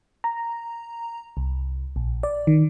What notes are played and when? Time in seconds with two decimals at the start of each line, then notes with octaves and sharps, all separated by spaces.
0.24 A#5
1.37 C2
1.96 A#1
2.23 D5
2.47 D#3